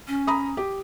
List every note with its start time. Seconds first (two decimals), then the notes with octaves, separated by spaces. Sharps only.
0.08 C#4
0.27 A#5 B5 D#6
0.57 G4